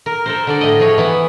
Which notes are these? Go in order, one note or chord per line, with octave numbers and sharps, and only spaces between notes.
A#4
A4 A#4 C5
D3 A4 D5
A2 D#5
F3 G#4 C#5
E3 B3